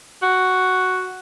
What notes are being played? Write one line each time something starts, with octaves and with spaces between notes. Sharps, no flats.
F#4